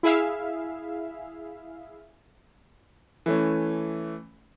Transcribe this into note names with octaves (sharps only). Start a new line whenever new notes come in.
E4 G#4 E5 F5
E3 A3 C#4